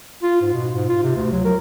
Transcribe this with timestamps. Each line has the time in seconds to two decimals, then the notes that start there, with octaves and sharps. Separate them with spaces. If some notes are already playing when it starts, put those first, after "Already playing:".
0.23 F4
0.41 G#2
0.53 B2
0.74 G#2
0.89 F4
1.03 C3
1.16 D2
1.32 F#3
1.45 A#4